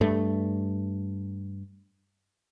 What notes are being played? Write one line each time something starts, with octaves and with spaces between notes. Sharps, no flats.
G2 A3